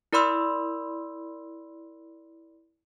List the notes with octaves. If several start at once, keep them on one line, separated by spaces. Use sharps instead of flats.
E4 A#4 D5 B5 C6 E6